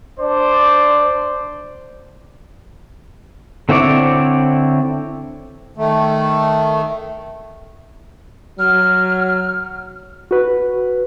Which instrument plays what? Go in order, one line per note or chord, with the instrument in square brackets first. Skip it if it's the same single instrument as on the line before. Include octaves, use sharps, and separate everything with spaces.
[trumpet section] D4 C5 D5
[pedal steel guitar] D3 C4 E4 C#5 D5
[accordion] D#3 A3
[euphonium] F#3 [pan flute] F6
[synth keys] F#4 B4